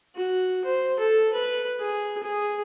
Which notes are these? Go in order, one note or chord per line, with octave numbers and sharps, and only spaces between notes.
F#4
C5
A4
B4
G#4
G#4